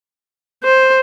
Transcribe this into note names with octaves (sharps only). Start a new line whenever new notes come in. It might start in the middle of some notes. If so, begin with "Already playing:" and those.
C5